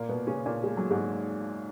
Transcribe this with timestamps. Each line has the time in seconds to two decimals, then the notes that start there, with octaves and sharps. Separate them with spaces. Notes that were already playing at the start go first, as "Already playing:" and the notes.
Already playing: A#2 A#3
0.09 B2 B3
0.27 C#3 C#4
0.46 A#2 A#3
0.63 G#3
0.77 F#3
0.90 G#2 G#3